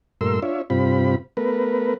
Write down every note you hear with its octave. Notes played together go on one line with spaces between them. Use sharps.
G2 A#2 A3 A#4 C6 E6
D4 F4 C#5 E5
G2 C3 C4 F4 B5
A3 B3 A#4 B4